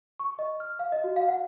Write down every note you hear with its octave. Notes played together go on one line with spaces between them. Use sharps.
C#6
D#5
F6
F5
D#5
F#4
F5
F#5